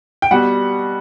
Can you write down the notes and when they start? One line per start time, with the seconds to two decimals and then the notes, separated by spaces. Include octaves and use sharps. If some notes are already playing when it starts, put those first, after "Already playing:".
0.22 G5
0.31 B2 G3 F#5